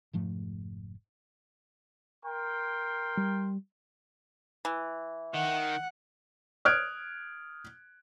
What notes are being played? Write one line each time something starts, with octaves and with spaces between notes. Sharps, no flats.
F1 G#2 F3 A3
A#4 G5 C6
G3
E3
D#3 F#5
D#6 F6 F#6 G#6 D7